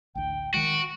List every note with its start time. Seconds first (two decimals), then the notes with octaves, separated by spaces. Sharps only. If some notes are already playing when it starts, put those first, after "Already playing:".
0.15 A1 D2 G5
0.54 D#3 G#3 F#4 D7